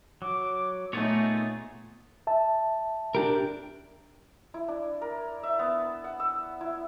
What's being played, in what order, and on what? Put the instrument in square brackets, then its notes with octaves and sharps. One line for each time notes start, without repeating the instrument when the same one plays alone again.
[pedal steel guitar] F#3 [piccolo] D6
[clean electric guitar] A#2 B3 [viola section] A3 D#4 [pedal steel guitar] G#4 C#5 [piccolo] A6
[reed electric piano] E5 A5
[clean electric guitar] D4 G4 A#4
[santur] E4
D4
A#4
E5
B3
F#5
E6
E4